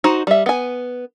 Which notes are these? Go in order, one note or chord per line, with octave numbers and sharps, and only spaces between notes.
D#4 F#4 C5
G3 E5
B3 G#5